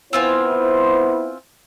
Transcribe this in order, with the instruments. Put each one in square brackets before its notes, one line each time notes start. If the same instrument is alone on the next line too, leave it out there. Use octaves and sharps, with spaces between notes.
[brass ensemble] B3 E4 C5 [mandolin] C4 F4 G#5